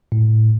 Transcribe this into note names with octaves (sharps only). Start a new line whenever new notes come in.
A2